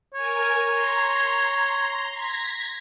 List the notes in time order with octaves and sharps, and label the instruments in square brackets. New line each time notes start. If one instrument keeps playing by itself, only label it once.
[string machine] A#4 G#5 [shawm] C#5
[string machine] A#5 C6
G#6 A#6 B6